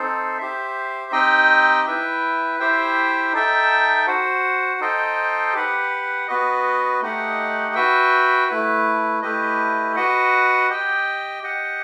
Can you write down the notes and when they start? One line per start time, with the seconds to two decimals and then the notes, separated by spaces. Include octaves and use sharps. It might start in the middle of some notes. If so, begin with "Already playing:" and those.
Already playing: C4 D#4 A4 C5
0.38 G4 C5 E5
1.12 C4 D#4 G4 D#5 G5
1.85 E4 B4 E5 G5
2.59 E4 G4 C5 E5 G5
3.33 D#4 A4 E5 G5
4.07 F#4 C5 F#5
4.80 D#4 A4 C5 D#5 G5
5.54 G4 B4 F#5
6.28 B3 F#4 B4 D#5
7.02 A3 D#4 G4 D#5 F#5
7.75 F#4 B4 E5 G5
8.48 A3 E4 B4
9.22 A3 E4 G4 B4 D#5
9.96 F#4 B4 D#5 F#5
10.69 G4 D#5 G5
11.43 G4 D#5 F#5